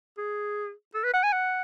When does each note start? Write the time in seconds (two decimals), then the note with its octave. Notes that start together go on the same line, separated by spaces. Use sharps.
0.18 G#4
0.94 A4
1.03 B4
1.13 F#5
1.23 G#5
1.33 F#5